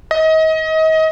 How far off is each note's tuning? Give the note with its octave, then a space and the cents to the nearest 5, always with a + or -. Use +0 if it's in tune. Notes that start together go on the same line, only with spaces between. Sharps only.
D#5 +35